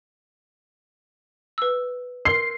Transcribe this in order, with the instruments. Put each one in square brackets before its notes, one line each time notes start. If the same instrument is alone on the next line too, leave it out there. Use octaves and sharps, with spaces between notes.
[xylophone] B4 E6
[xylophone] A#4 C6 [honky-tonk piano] C7